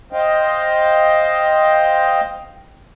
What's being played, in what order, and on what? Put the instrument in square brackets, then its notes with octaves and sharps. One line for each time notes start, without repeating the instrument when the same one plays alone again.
[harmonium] C5 D#5 F5 G5